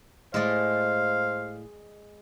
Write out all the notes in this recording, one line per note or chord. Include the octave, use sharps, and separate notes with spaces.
A2 G#3 C5 D5 F5